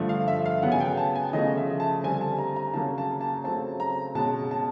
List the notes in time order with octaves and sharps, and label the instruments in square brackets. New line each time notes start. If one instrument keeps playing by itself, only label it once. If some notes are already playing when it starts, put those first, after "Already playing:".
Already playing: [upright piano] G2 D3 F3 A3
F5
E5
F5
C#3 F#3 B3 F#5
G#5
G5
A5
G#5
C#3 F3 A3 C#4 D#5
E5
A5
D3 G3 C4 G#5
A5
A#5
A#5
C#3 F#3 A#3 C#4 A5
A5
A5
C#3 F#3 A3 C4 A5
A#5
B2 G#3 C#4 A5
A5